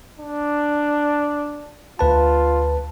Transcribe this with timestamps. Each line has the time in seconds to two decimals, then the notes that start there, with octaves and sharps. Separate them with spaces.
0.19 D4
1.99 D2 F4 B4 A5